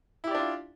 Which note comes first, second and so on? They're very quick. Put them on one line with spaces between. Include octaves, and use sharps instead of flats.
E4 G4 D5 D4 F4